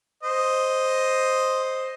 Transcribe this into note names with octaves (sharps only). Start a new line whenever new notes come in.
C5 D#5